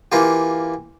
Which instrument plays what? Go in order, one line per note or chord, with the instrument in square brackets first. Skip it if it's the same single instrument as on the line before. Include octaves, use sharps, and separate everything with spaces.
[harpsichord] E3 A#3 F4 G4